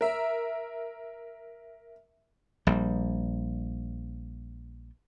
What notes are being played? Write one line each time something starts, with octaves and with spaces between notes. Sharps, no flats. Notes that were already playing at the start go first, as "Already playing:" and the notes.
A#4 E5
A#1 G3